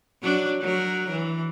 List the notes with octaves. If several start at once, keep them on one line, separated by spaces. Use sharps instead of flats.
F#3 D4
F#3 A#4
E3